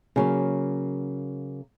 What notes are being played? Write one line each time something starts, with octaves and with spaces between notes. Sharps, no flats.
C#3 F#3 A#3